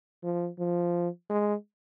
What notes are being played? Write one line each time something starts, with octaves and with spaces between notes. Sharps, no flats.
F3
F3
G#3